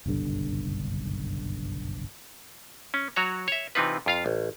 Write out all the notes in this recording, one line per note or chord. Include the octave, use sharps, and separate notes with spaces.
F#1 B1 G2 D3
C#4
F#3 F#4 C#5 A#5
C#5 E5
C3 E3 C4 D#4 F4 B4
F2 F4 F5
A1